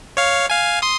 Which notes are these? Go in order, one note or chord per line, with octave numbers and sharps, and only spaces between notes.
C#5 F5
F5 G#5
C6 D#6